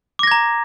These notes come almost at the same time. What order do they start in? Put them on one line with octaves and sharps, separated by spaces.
D6 A#6 G#6 A#5